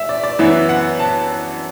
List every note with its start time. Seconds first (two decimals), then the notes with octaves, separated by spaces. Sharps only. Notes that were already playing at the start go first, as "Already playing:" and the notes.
Already playing: E5
0.09 D5
0.24 D5
0.39 F#2 E3 B3 E4 E5
0.69 F#5
0.99 A5